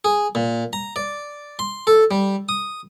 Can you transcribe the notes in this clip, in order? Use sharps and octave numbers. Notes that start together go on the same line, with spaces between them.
G#4
A#2
A#5
D5
C6
A4
G3
D#6